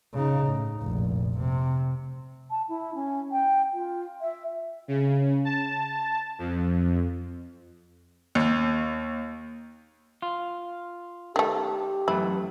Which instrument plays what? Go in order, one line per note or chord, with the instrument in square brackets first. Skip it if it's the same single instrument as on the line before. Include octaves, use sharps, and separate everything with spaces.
[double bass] C#3 D#4
A2
F1 A#1
C3
[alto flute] A5
E4
C#4
G5
F4
E5
[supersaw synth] C#3
A5
F2
[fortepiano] D#2
[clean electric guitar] F4
[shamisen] D#3 A3 [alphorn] G4 [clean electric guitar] A4
[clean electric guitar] F#2 E3 A3 [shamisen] E4